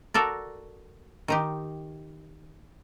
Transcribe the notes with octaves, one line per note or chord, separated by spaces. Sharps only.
F#4 A4 A#4 D5
D#3 D#4 G4